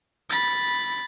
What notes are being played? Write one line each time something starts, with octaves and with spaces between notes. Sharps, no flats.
B5 A6